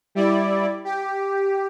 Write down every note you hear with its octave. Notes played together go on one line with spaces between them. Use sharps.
G3 E4 D5
G4